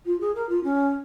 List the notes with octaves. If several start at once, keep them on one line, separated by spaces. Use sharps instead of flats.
F4
G#4
A#4
F4
C#4